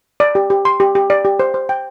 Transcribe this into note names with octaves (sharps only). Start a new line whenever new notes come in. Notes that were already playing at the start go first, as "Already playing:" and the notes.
D5
G4
G4
C6
G4
G4
D5
G4
C5
C5
G5